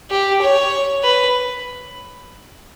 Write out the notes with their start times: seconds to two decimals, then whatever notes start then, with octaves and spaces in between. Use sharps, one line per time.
0.10 G4
0.41 C#5
1.03 B4